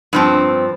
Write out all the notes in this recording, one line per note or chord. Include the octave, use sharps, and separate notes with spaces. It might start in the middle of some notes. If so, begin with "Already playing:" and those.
G2 F3 C4